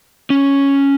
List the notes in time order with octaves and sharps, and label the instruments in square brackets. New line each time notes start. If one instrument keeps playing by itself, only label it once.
[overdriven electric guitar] C#4